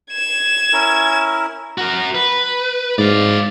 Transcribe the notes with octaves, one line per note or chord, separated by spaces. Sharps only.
G#6 E7
C#4 E4 A#4
F#4 A#4
B4
G#2 D5 F5